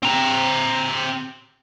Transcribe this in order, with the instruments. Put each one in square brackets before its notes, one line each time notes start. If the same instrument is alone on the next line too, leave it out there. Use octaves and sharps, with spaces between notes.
[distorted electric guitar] C4 A#5